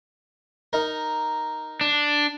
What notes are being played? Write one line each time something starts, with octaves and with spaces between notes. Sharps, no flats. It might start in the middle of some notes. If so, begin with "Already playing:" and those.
D#4 A#4
D4